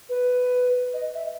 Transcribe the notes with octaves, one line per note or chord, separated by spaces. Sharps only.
B4
D#5
E5